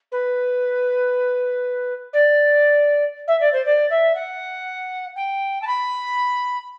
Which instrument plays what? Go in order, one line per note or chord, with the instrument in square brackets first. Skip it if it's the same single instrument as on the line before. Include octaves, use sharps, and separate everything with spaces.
[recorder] B4
D5
E5
D5
C5
D5
E5
F#5
G5
A5
B5